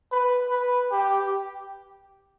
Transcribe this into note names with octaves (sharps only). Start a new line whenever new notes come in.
B4
B4
G4